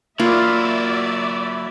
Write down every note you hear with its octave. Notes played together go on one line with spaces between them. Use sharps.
F#3 A#3 E4 F4 D5 E5